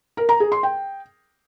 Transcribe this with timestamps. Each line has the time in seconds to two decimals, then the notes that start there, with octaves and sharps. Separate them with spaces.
0.17 A#4
0.29 A#5
0.40 G#4
0.52 C6
0.63 G5